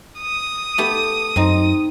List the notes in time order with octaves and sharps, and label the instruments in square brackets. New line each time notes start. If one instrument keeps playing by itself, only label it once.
[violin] D#6
[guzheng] A3 B3 G4
[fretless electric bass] F#2 [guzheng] C4 D#4